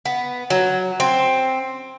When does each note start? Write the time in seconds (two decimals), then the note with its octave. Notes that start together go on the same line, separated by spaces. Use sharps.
0.05 B3
0.50 F#3
1.00 C4